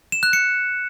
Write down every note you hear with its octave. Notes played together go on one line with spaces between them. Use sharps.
E7
F#6
C#7